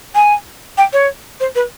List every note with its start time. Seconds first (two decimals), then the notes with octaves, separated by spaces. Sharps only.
0.15 G#5
0.78 G5
0.93 C#5
1.40 C5
1.55 B4